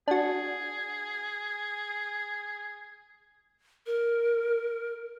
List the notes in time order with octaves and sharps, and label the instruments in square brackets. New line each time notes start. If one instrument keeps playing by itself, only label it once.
[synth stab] D4 F#4 [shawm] G#4
[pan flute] A#4